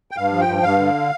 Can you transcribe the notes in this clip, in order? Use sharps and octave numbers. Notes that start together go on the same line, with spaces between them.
G5
G2 F5
F3
G5
G2
G2 F5
D3